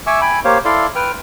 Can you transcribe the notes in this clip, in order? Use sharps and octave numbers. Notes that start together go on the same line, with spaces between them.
E5 G#5 C#6 D6 E6
G5 G#5 B5
A#3 G4 C5 C#5 F5
E4 A4 D5 F5 C6
B4 G5 F6